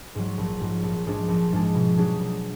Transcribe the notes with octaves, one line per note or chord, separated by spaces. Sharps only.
G#2 F#3
A#1
G#2 F#3
A#1
G#2 F3 G#3 D4
A#1
G#2 F3 G#3 D4
B2
F#3 D4 G#4
B2